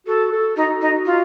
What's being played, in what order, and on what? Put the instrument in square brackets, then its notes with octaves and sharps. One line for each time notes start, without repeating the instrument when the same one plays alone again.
[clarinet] F#4 [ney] A4
[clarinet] A4
[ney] D#4 [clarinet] F#4
[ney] D#4
F4